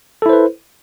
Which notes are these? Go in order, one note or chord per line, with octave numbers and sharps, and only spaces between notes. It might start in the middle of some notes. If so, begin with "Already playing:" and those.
E4 A4 B4 C5